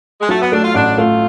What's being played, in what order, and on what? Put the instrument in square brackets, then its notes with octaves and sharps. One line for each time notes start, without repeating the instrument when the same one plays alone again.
[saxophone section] G#3
[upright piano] F#3 [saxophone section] A3
[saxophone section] B3
[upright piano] A3 [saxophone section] D4
[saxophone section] F4
[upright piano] A1 [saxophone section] D4
[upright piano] A3 [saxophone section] F4